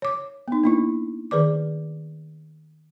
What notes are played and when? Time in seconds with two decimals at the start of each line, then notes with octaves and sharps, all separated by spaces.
0.02 C#5 D6
0.48 B3 D#4
0.64 A#3 D4 E4
1.31 D#3 G#4 B4 D5 D6